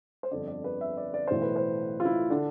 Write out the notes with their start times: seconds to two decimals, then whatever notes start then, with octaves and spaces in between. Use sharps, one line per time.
0.23 C5
0.31 G1 F2 D3 D5
0.48 D5
0.64 B4
0.81 E5
0.98 D5
1.14 D5
1.27 B1 A2 E3 C5
1.42 B4
1.56 C5
2.00 F4
2.05 E4
2.30 D3 D4